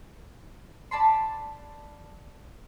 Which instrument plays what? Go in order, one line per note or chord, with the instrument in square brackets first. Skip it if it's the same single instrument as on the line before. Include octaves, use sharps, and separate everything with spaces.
[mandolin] D5 A5 B5 C6